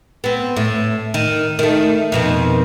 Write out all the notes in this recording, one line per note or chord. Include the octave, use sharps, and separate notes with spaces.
B3 C4
A2
D#3
D#3 A3
F2 B2 D#3